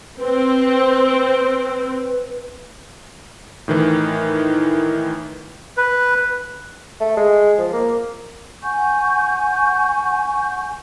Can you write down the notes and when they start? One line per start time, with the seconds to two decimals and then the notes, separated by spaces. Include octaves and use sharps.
0.19 C4 B4
3.68 A2 D#3 E3
5.77 B4
7.00 A3
7.17 G#3
7.58 F3
7.73 A#3
8.63 F#5 G#5 C#6 G6